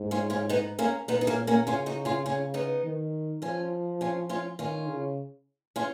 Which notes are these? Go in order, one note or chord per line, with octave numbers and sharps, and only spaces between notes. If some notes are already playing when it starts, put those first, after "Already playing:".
Already playing: G#2
C#4 F4
C#4 F4
B3 D#4
A#3 C#4
A#2 B3 D#4
D#4
A#3 C#4
A#3 C#4
C#3 C#4 F4
D#4 F#4
C#4 F4
C#4 F4
B3 D#4
D#3
F3 C#4 F4
C#4 F4
C#4 F4
D#3 C#4 F4
C#3
C#4 F4